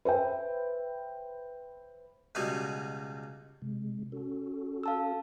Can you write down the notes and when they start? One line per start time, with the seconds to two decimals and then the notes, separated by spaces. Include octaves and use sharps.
0.05 B4 C5 E5 G5
2.35 C#2 B2 G3 D#4 F#4 G#5
3.62 C3 G#3
4.12 C#4 F#4 A4
4.83 F5 A5 E6